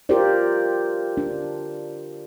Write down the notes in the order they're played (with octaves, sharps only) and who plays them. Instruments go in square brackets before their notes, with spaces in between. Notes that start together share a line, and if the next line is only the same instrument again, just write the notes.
[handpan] F4 G4 A#4 C5 D5
D4